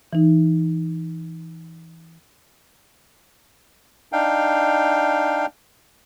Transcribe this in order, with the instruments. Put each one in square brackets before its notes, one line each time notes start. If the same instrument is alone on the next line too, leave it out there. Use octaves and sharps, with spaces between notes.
[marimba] E3 D#4
[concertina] D4 D#4 F5 G5